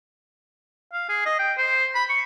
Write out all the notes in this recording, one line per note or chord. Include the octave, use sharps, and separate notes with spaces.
F5
G#4
D#5
G5
C5
B5
C#6